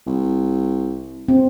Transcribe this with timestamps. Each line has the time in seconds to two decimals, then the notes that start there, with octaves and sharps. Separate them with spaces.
0.07 C2
1.28 C4